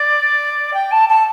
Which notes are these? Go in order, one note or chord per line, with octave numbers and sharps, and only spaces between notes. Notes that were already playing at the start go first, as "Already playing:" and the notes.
Already playing: D5
G5
A5
A5